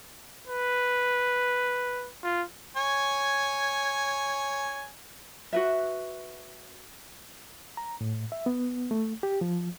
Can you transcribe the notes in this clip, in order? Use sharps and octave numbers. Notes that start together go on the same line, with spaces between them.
B4
F4
C#5 G#5
F#4 B4 E5
A#5
A2
E5
B3
A3
G4
F3